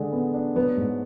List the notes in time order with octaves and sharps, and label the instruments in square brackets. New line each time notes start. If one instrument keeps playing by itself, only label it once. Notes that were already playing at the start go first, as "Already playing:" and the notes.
Already playing: [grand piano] D3 G#3
B3
D4
[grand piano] F#3 [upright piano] B3
[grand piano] G#2